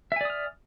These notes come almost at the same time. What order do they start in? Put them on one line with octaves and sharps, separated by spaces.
E5 G#5 D5 D#6 F6